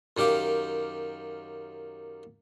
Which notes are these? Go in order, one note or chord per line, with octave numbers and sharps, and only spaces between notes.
F#2 D#3 G4 F5 D6